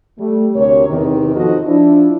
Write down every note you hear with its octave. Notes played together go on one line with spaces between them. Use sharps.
G3 A3
D2 C3 A#4 C#5
E2 C3 D#3
F3 D#4 F#4 A4 C5 D#5
F3 D4 E4